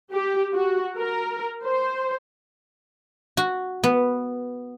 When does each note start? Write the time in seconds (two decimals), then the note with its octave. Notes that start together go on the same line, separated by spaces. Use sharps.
0.13 G4
0.54 F#4
0.98 A#4
1.64 C5
3.37 F#4
3.84 B3